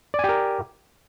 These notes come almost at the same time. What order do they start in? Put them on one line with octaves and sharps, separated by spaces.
D5 G#5 G4 A#4